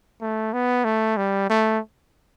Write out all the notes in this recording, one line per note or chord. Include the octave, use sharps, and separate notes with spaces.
A3
B3
A3
G3
A3